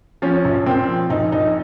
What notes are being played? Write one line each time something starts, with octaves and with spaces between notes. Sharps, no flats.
F3 C#4
A#1
A#2 C4
F3
A#1 D#4
A#1 D#4